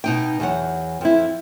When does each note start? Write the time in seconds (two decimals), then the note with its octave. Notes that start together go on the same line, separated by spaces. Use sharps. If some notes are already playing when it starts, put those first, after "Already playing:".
0.04 B2 D#4 G5
0.40 E2 F#3 F#5
1.01 F2 E4